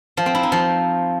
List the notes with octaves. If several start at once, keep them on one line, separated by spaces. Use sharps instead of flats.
F3
C4
E4
D#4
F3